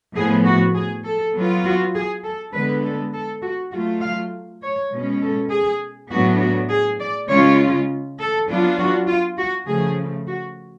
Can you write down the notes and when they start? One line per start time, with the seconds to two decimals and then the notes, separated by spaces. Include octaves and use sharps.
0.15 A2 F3 B3 G#4
0.45 F#4
0.75 G#4
1.04 A4
1.35 F#3 B3 F4
1.65 F#4
1.95 G#4
2.24 A4
2.53 D3 G#3 B3 B4
2.84 A4
3.13 A4
3.42 F#4
3.72 F#3 A3 F4 F#4
4.02 F5
4.62 C#5
4.91 B2 G#3 C#4
5.21 A4
5.51 G#4
6.11 A2 F#3 B3 D4 F#4
6.40 F#4
6.69 G#4
7.00 D5
7.29 C#3 G#3 C#4 F4 C#5
8.19 A4
8.49 F#3 B3 D4 F4
8.78 F#4
9.07 F4
9.38 F#4
9.67 C#3 F3 A3 G#4
10.27 F#4